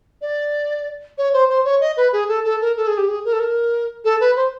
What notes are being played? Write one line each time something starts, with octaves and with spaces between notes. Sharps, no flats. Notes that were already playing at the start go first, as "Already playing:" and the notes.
D5
C#5
C5
C5
C#5
D#5
B4
G#4
A4
A4
A#4
A4
G#4
G4
G#4
A#4
A4
A#4
A4
B4
C5